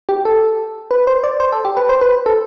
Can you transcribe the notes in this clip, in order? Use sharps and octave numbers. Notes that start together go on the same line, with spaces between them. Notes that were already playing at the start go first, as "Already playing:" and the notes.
G4
A4
B4
C5
D5
C5
A4
G4
B4
C5
B4
A4